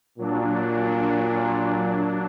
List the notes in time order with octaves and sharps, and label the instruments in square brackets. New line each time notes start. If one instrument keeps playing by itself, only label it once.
[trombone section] A#2 [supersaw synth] F#3 D4